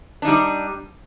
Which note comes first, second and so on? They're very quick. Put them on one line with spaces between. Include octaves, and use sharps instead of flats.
D4 D#4 G3